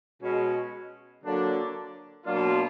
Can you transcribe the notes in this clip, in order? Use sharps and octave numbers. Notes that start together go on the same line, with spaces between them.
B2 G#3 C#4
D3 F#3 A#3 D4
B2 F#3 A#3 D4 F4